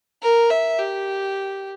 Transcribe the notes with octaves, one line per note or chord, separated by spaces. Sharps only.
A#4
E5
G4